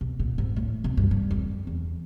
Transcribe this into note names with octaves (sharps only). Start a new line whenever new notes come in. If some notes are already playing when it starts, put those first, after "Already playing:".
B2
A#2
G#2
A2
B2
G2
G2
F2
E2